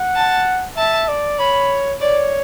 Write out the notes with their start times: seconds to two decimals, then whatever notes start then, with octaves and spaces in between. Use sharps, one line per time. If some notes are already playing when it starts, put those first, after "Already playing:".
Already playing: F#5
0.16 A5
0.77 E5 A5
1.08 D5
1.39 C#5 B5
2.01 C#5 D5